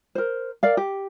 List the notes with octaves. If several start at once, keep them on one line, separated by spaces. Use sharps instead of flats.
A#4 C5
A#4 D5 F5
G4